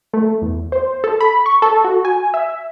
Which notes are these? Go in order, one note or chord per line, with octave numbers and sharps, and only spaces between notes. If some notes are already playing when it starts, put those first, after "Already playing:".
A3
E2
C5
A4
B5
C#6
A4
F#4
G#5
E5